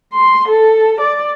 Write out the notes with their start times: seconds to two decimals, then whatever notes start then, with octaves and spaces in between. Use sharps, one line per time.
0.14 C6
0.49 A4
1.01 D5